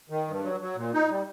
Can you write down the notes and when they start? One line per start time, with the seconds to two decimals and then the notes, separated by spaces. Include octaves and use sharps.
0.10 D#3
0.27 G2
0.43 F#3
0.60 F#3
0.76 A#2
0.94 D#4
1.10 G3